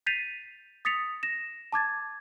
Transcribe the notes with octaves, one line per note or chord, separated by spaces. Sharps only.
G6 A6 B6 C7 D#7 F7
D#6 A6 B6 C#7 F7
A#6 E7
A5 D6 G#6 A6